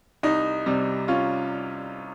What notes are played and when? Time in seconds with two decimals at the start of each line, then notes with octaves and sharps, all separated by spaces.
0.23 C2 D#4
0.66 C3 G3
1.08 C#4 F4